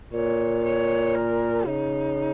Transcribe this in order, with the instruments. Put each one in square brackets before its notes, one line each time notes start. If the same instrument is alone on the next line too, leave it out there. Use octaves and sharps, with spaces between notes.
[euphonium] A#2 [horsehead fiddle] C#5
[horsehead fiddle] C#5
A#4
[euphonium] C#3 [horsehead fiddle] D#4